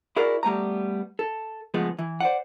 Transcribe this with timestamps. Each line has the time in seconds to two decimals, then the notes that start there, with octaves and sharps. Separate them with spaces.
0.17 E4 F#4 G#4 A#4 D5
0.43 G3 A3 B3 A#5
1.19 A4
1.74 C#3 F3 G#3 A3 B3
1.99 E3
2.20 C5 D5 F#5